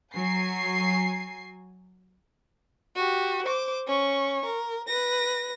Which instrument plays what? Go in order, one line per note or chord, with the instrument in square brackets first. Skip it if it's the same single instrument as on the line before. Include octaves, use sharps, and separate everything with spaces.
[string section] F#3 G#5 C7
[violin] F#4 G4
C5 D6
C#4 C#6
A#4
B4 A#6